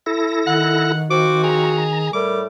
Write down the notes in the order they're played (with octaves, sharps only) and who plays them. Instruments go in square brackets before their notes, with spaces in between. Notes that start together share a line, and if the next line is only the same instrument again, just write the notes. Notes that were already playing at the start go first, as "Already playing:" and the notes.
[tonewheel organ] E4 A4 A#6
[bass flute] D#3 [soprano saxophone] F#5
[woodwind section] F3 C4 F#4 [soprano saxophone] D6
[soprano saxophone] G#4 [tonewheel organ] A#5
[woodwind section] A2 G3 [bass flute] A#4 [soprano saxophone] D6